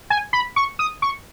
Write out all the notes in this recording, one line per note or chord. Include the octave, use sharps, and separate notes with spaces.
G#5
B5
C#6
D#6
C#6